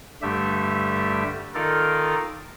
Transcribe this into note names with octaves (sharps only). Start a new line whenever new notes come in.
G2 D3 G3 A3 G4 E5
D#3 D#4 F4 A4 A#4 D5